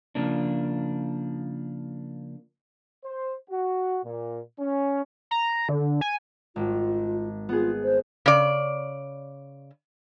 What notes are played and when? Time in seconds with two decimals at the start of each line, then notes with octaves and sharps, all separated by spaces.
0.15 C#3 F3 A#3 D4
3.04 C5
3.50 F#4
4.04 A#2
4.59 C#4
5.31 A#5
5.69 D3
6.01 G#5
6.56 G#1 F4
7.49 B3 F4 G#4
7.84 C5
8.26 C#3 D5